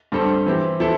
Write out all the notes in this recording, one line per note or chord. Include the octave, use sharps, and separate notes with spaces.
G2 G3 C4 A4
E3 C4 G4
E3 C4 E4 A4